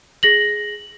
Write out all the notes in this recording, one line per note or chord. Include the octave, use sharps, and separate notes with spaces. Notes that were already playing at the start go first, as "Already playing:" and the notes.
G#4 A#6 F#7